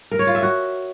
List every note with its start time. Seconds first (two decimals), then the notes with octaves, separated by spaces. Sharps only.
0.11 A#4
0.19 C#5
0.27 F4
0.35 E5
0.43 F#4